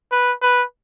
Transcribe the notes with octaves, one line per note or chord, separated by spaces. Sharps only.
B4
B4